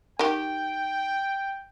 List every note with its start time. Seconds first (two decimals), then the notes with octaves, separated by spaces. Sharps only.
0.19 D#3 G4 G5